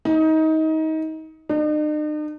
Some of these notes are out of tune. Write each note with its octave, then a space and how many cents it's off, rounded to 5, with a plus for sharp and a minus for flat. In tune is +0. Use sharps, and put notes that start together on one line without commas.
D#4 +25
D#4 -45